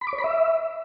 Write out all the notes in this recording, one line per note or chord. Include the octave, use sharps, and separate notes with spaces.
B5
D6
C#5
B5
E5